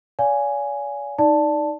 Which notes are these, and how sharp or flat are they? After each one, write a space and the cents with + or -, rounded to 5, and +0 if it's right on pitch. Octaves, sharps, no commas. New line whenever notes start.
D5 -45 F5 +0 G#5 +0
D#4 +0 D5 +0 A5 +0